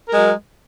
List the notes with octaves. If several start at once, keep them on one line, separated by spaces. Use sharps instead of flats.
F#3 G#3 A#4